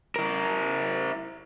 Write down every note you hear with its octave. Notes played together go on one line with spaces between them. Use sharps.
E4 A#4